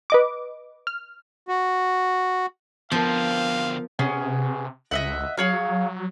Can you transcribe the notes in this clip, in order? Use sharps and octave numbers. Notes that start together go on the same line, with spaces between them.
B4 D#5 D6
F6
F#4
D3 F3 B3 C4 A#4 F5
C3 B3 C#4 G#4
C#2 D#5 E5 F#5
F#3 G#4 C#5 F5